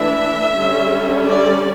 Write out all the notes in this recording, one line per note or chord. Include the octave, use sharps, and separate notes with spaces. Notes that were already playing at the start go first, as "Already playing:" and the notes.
Already playing: E3 A3 D4 E5
D3 G3 C#4
D5